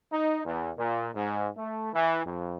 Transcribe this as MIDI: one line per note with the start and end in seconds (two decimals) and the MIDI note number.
0.12 0.38 63
0.45 0.69 40
0.77 1.08 46
1.14 1.47 44
1.57 1.92 57
1.93 2.22 52
2.25 2.57 41